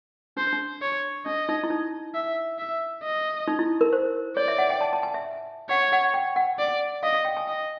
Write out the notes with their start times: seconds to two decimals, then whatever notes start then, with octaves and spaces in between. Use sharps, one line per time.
0.37 D4 C5
0.53 D4
0.82 C#5
1.26 D4 D#5
1.49 D#4
1.64 E4
1.70 D#4
2.14 E5
2.59 E5
3.04 D#5
3.48 D#4
3.59 E4
3.81 A#4
3.93 C5
4.37 C#5 D5
4.48 E5
4.58 F#5
4.70 G5
4.81 A5
4.93 A5
5.03 G#5
5.14 E5
5.70 C#5 F#5
5.92 F#5
6.14 G5
6.36 F#5
6.59 D5
7.03 D#5 F5
7.14 F5
7.25 G5
7.37 G#5
7.47 D#5 G#5